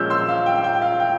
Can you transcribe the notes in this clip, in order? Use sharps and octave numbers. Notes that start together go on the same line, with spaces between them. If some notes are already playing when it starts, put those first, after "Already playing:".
Already playing: A#2 F3 G#3 C#4 E6 F6 G6
C6 E6
F5
G5
G5
F5
G5